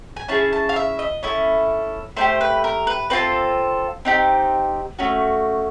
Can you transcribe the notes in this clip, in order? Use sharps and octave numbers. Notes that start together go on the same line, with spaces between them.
G#5
C#4 E4 G#4 A5
A5
F5
E5
D#5
C#4 E4 A4
A3 D4 G4 C5
B4
A#4
B4
C4 F4 A4 B4
C4 D#4 G4
A3 C#4 F#4